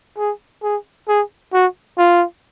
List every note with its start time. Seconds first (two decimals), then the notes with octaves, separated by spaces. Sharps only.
0.18 G#4
0.63 G#4
1.08 G#4
1.53 F#4
1.98 F4